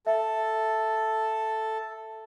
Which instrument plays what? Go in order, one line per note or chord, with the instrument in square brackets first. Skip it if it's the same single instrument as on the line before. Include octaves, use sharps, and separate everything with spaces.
[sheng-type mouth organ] A4 [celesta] E5